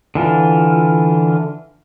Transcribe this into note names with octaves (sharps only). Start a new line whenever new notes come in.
D3 E3 F4